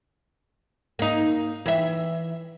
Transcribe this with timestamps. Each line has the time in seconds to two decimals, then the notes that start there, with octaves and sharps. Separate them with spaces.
0.99 A#3 D#4
1.66 E3 E5